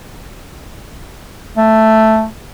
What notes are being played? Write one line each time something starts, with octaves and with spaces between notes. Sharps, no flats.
A3